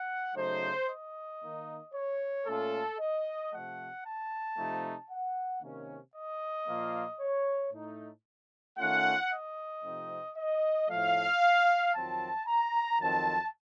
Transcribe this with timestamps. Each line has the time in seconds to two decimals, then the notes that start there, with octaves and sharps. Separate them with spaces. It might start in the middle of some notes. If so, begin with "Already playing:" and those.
Already playing: F#5
0.36 C#3 F#3 A3 D#4 C5
0.88 D#5
1.41 D#3 A#3 D#4
1.94 C#5
2.46 A#2 A3 C#4 F4 A4
2.99 D#5
3.52 C3 F3 A3 F#5
4.05 A5
4.57 C3 F3 A3 D#4
5.10 F#5
5.62 C3 D#3 A#3 C#4
6.15 D#5
6.68 A#2 F3 A#3 F4
7.20 C#5
7.73 A2 A3 D#4
8.78 D#3 A3 C#4 F4 F#5
9.31 D#5
9.83 C3 F3 A3 C4 D#4
10.37 D#5
10.89 A2 F3 A3 F5
11.94 F2 D#3 F#3 C4 F4 A5
12.46 A#5
13.00 F2 D#3 F#3 C4 A5